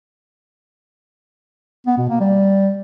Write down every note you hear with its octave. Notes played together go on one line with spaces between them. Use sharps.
B3
B2
A#3
G3